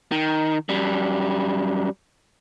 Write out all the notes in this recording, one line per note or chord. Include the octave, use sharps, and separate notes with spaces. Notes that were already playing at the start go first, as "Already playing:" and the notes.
D#3
F#2 G3